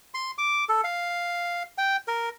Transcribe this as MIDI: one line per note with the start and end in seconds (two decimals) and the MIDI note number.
0.14 0.31 84
0.38 0.65 86
0.69 0.81 69
0.84 1.63 77
1.78 1.96 79
2.08 2.29 70